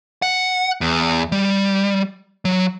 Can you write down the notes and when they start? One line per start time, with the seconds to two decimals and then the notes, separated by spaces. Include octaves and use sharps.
0.22 F#5
0.81 E2
1.32 G3
2.45 F#3